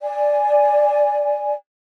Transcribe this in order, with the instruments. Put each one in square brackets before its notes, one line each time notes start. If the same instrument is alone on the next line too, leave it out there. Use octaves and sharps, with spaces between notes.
[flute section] D5 G#5